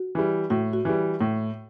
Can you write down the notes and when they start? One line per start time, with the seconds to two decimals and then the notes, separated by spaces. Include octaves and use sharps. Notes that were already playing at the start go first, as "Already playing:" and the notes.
Already playing: F#4
0.15 E3 G3
0.50 A2 F#4
0.73 F#4
0.85 E3 G3
1.21 A2